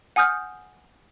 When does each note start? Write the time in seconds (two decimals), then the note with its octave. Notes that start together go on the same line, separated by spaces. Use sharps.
0.16 F#5 G#5 D#6 F6 G6